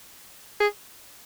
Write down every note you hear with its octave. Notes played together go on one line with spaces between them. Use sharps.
G#4